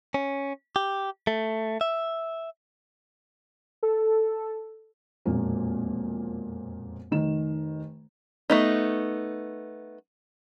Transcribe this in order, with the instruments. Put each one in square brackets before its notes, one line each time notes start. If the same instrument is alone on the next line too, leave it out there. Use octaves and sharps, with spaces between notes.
[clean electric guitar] C#4
G4
A3
E5
[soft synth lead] A4
[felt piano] E1 F2 A#2 A#3
F1 D#3 E7
[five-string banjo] A3 B3 D#4